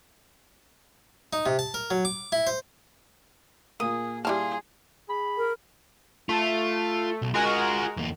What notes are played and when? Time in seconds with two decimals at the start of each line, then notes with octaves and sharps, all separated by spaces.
1.33 D#4
1.46 C3
1.59 A5
1.74 A#4
1.91 F#3
2.05 D6
2.32 E4
2.47 C5
3.80 A#2 A#3 G#4 D#6
4.25 G3 E4 G#4 F5 A5 C6
5.09 G#4 B5
5.38 A#4
6.29 A3 F4
7.22 B1
7.34 G#3 F4 F#4 G#4 A#4
7.97 E2 A#3